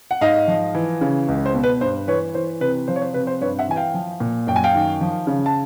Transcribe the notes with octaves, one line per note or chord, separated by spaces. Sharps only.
F#5
G#2 D#5 F5
F3
E3
C#3
C#2
C5
B2
B4
G2 C5
E3 B4 C#5
E3 C5
C3 B4
F3 C5
C#5
C5
C3 B4
C5
G2 B4 C#5
E5 F#5
E3 G#5
F5 G5
F3
A#2
F#2 G5
G#5
F5 G5
D#3
F3
C#3
A5